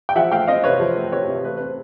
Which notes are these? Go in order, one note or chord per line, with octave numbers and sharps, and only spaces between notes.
G5
F3 E5 F#5
A3 F5 G5
C4 D#5 F5
C3 B4 C#5
F3 C5
A3
C4 B4 C#5
C3
A3 B4
B4
C4 C5